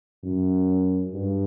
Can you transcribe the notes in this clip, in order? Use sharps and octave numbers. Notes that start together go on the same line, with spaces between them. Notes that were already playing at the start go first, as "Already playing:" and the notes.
F#2
G2